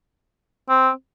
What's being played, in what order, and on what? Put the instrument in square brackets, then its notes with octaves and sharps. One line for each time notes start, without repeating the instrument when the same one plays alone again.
[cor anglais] C4